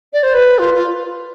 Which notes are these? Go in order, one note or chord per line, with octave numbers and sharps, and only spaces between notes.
D5
C5
B4
F4
F4